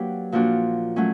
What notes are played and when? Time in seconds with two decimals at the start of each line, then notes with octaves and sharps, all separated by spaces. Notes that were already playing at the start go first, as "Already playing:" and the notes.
Already playing: F#3 A#3 D4 G4 B4
0.32 A#2 F3 A#3 D4 F#4
0.96 F#3 A3 C#4